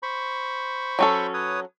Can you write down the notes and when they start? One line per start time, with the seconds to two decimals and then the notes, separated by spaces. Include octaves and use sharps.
0.03 C5 B5 C#6
0.99 F#3 C#4 A4
1.34 B4 C#5 D#6